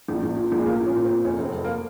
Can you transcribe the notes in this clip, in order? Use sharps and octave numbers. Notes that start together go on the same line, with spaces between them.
A#1
A#1
A#2
A#1
G#3
A#2 A#3
A#2
C#4
A#2
C4
A#2
F1 C#4
F1
C4
F1
A#3